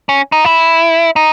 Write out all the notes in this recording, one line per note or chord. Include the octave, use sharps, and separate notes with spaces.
C#4
D#4
E4
D#4